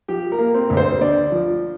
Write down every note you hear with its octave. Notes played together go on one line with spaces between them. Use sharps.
F3 G4
A#4
A#3
C4
D2
C5
D3 D5
F3